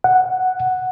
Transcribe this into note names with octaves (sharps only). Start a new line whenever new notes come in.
F#5